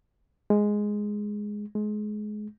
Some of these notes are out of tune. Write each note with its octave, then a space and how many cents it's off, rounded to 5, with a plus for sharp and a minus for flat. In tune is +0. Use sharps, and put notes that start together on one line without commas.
G#3 +0
G#3 +25